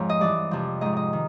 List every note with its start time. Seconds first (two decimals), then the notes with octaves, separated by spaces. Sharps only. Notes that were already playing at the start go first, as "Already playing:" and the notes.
Already playing: F2 G#2 F3 C#5
0.09 D#5
0.20 G2 E3 D5
0.51 F2 C3 F3
0.81 G#2 F3 D#5
0.97 D#5
1.13 D#3